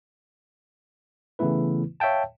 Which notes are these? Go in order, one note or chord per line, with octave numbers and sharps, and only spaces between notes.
C#3 E3 A3 B3 E4 B4
C#5 E5 F5 G5 A5